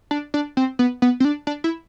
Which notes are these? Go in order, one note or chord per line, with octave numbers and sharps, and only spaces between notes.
D4
D4
C4
B3
B3
C4
D4
D4
E4